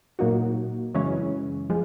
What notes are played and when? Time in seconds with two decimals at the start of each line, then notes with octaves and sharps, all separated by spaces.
0.19 A#2 F#3 A#3 D#4 F#4
0.94 F#2 C#3 E3 G#3 C#4
1.70 F3 G#3